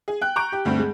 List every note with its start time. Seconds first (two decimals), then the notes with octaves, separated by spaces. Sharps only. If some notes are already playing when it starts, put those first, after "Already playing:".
0.08 G#4
0.21 G5 F#6
0.36 A#5 C#6 G6 D7
0.52 G4
0.65 D2 G2 A3 C4
0.78 G#3